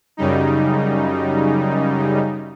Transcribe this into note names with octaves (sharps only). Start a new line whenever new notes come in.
F#2 C#3 G3 D#4